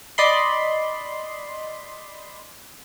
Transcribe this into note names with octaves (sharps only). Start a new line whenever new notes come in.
D5 D#5 B5 C6